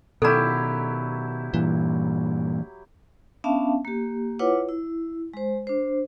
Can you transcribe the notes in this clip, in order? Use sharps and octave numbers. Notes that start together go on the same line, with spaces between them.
B2 D#3 F#3 E4 G4 A4 A#5
G2 A#2 E3
B3 C#4 D4 E5 F5 A5
A#3 G4
E4 F4 B4 C#5 F#5 D6
E4
G#3 C5
D4 C5